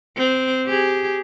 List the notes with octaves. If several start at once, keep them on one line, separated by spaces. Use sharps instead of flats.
C4
G4 G#4